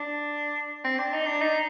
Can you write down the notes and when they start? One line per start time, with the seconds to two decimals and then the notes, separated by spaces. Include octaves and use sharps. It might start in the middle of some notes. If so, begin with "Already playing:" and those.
Already playing: D4
0.84 C4
0.99 D4
1.13 D#4
1.26 D4
1.41 D#4